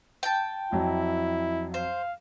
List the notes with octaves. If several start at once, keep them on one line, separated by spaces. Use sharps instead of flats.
G5 A5
F2 F#3 E4
C5 F5